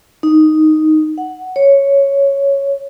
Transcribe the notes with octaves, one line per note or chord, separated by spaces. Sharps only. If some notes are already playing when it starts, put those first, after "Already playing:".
D#4
F#5
C#5